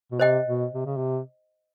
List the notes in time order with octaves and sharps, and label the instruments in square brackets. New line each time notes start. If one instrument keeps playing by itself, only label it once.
[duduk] B2
[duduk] C3 [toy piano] C5 D#5 G5
[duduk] B2
C3
C#3
C3